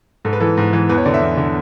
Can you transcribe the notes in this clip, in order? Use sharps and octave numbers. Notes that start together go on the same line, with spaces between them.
G#2 A4
B4
E3 A4
G#2
E3
E2 B4
C#5
D3 D5
E5
E2
D3